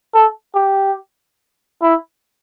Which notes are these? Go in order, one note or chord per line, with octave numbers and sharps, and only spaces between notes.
A4
G4
E4